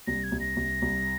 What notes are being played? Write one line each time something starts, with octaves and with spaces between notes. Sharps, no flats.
C2 A#6
G#6
C2
A#6
C2
C2